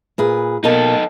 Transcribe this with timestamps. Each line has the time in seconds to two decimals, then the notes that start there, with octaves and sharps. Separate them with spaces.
0.18 A#2 G#4 B4
0.64 B2 A#3 D#4 A4 A5